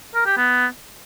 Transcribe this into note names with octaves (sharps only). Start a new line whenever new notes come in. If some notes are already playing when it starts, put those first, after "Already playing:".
A#4
G4
B3